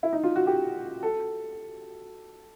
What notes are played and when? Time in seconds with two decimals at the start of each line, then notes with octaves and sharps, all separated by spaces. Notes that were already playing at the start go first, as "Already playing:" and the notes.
0.03 E4
0.13 D#4
0.23 F4
0.36 F#4
0.47 G4
1.03 A4